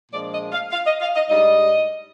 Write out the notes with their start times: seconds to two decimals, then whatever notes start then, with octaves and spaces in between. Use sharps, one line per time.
0.12 A#2 F3 G#3 D4 D5
0.33 D#5
0.52 F5
0.72 F5
0.86 D#5
1.01 F5
1.15 D#5
1.29 G#2 G3 D4 D#5